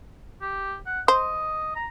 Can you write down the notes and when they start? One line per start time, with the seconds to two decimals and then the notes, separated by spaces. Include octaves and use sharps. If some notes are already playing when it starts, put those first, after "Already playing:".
0.41 G4
0.86 F#5
1.08 C5 D#5
1.76 A#5